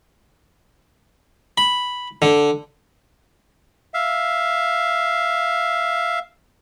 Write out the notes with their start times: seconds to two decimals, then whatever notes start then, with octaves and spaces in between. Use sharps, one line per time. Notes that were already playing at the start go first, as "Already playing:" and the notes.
1.58 B5
2.22 D3
3.94 E5 F5